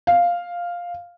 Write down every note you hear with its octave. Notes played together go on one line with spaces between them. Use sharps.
F5